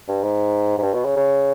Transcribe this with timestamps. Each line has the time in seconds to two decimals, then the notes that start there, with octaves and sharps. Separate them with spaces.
0.08 G2
0.23 G#2
0.78 G#2
0.82 G2
0.94 B2
1.05 C#3
1.16 C#3